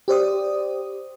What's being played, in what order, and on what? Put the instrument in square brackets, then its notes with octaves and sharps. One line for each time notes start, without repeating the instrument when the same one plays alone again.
[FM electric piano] G4 C5 D5 D#6